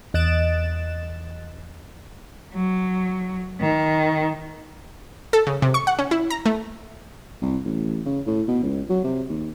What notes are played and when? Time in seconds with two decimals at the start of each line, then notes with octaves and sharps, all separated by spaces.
0.14 E2 D#5 F#6 A6 D7 E7
2.53 F#3
3.60 D#3
5.33 A4
5.47 C#3
5.62 C3
5.74 C#6
5.87 F#5
5.99 C#4
6.11 E4
6.30 A#5
6.46 A3
7.42 C2
7.65 A1
8.06 C#3
8.27 A2
8.48 B2
8.63 C#2
8.90 F#3
9.04 C3
9.30 D#2